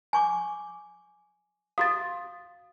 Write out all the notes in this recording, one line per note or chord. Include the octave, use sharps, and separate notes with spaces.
G#5 C#6 D6
F#4 F5 D#6 A6